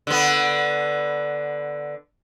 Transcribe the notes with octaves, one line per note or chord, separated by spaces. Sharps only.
D3 B3